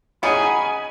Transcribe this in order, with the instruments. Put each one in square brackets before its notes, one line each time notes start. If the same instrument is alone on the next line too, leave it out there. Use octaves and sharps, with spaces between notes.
[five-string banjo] C#4 D#4 G#4 [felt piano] F#5 D#6 C#7 [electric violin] G#5 [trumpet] B5